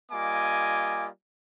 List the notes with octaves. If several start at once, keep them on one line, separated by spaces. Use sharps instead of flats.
G3 A#3 F4 D#5 G#5 D6